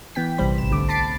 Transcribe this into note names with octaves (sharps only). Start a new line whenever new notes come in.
E3 B3 G5 B6
A#1 C3 E3 G3 C5 B5
G#1 C3 E7
C2 D3 A3 D6
A5 B5 D6 A6 C7 D7